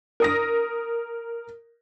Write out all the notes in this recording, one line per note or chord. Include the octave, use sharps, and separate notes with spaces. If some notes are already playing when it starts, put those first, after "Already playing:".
A#4 D#6 A#6